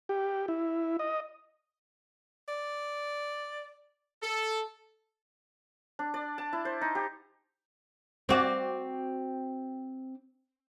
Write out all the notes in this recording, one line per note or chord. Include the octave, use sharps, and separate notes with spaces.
G4
E4
D#5
D5
A4
D4
D5
A5
E4
C5
D#4
G4
C4 F#4 D5